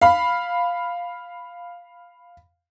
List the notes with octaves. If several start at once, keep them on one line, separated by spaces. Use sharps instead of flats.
F5 B5